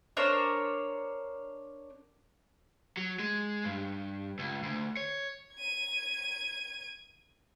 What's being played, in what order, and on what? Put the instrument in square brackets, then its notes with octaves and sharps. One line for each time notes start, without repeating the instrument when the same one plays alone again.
[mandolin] D4 A#4 C5 C#5
[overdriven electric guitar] F#3
G#3
G2
C#2
D2
C#5
[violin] G#6 D#7